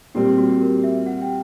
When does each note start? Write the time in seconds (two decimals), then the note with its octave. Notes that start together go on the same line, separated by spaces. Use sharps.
0.15 A#2 G3 C4 G4
0.27 G4
0.38 F#4
0.49 G4
0.61 A#4
0.84 E5
1.06 F#5
1.21 G5